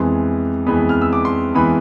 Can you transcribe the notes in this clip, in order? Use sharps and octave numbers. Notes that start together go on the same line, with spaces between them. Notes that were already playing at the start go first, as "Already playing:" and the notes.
Already playing: F2 E3 G#3 B3 C6
F2 E3 G#3 B3 B5
F6
E6
D6
C6
E3 G#3 B3 B5